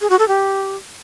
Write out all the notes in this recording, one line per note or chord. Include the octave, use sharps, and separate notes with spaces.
G#4
F#4
A4
G4